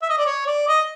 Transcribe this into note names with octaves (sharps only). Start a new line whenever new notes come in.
E5
D#5
D5
C#5
D5
D#5